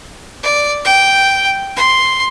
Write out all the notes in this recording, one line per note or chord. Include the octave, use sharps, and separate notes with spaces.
D5
G5
C6